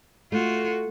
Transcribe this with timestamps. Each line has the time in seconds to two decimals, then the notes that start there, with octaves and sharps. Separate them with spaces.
0.32 A3 F4 F#4